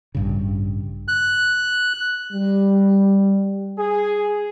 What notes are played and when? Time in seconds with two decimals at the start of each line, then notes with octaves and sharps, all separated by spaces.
0.15 A1 G2 C#3
1.08 F#6
2.32 G3
3.77 G#4